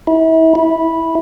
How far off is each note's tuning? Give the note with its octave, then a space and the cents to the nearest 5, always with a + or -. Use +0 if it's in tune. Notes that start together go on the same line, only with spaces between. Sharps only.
E4 -35
E4 -10